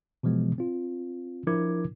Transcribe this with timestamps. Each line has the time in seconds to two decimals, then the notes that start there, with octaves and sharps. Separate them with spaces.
0.23 B2 E3 F3 G#3 B3
0.58 C4 F4
1.47 F3 D4 E4 A#4 D6 G#6